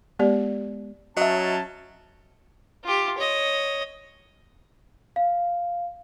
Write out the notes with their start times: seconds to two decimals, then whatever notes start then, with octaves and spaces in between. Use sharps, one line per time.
0.19 G#3 B3 G4 D5
1.17 F#3 C#4 D#5 E5 A5
2.85 F4 G4
3.18 C#5 D#5
5.16 F5